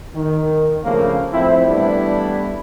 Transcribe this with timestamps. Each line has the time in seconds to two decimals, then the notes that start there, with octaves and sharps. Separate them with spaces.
0.15 D#3
0.84 G2 C#3 F3 A3 A#3
1.33 A2 F3 C4 E4
1.66 E3 G3 A3 B3 D4 E4